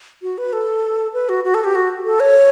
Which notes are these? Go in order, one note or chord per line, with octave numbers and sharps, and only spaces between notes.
F#4
B4
A4
B4
F#4
F#4
A4
G4
F#4
A4
C#5